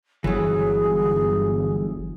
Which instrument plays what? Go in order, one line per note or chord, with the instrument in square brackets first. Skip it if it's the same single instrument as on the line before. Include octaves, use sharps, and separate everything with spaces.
[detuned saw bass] G1 [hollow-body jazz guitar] E3 F#3 [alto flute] G#4